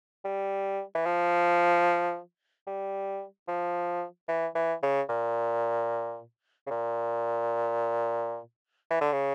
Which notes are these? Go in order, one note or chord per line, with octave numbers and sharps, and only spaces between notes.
G3
E3
F3
G3
F3
E3
E3
C#3
A#2
C#3
A#2
E3
D3
C#3